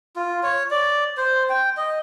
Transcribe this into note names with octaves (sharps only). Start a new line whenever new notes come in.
F4
C#5
D5
C5
G5
D#5